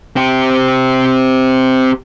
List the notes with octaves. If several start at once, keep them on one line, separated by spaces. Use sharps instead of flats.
C4 G4